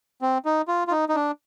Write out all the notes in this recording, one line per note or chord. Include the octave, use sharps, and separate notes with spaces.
C4
D#4
F4
F4
D#4
D#4
D4